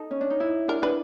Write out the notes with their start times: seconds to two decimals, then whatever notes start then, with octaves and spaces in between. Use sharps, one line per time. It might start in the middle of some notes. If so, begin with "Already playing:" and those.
Already playing: D#4 A4
0.11 C#4
0.21 D4
0.30 D#4
0.40 E4
0.68 D4 A#4
0.82 D4 B4